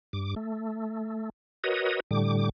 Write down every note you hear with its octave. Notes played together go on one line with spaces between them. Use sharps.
G2 D6
A3
F#4 A#4 B4 C#5 D#5 D#6
A2 D3 G3 D6